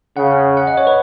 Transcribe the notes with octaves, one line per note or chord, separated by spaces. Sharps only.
C#3 F#5
F#5
D#5
C#5
B4